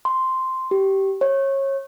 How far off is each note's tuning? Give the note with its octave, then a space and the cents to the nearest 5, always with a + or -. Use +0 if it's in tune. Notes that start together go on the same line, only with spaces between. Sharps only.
C6 -5
G4 -15
C#5 -25